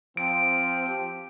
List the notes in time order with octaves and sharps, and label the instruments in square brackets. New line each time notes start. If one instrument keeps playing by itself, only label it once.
[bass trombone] F3 [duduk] C4 [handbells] D7
[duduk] G4